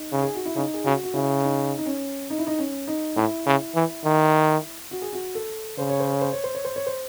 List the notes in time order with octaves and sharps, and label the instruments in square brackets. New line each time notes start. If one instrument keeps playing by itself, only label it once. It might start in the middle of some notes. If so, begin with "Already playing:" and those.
Already playing: [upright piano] D#4
[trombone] C#3
[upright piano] G#4
F#4
E4
[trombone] C#3 [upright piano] D#4
[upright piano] G#4
[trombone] C#3 [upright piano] F#4
[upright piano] F#4
[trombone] C#3 [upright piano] E4
[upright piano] D#4
D#4
C#4
D#4
E4
D#4
C#4
D#4
[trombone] A2 [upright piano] E4
[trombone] C#3
E3
D#3
[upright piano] F#4
G#4
F#4
A4
[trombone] C#3 [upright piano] C5
[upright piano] C#5
C5
C#5
C5
C#5
C5
C#5
C5
C#5
C5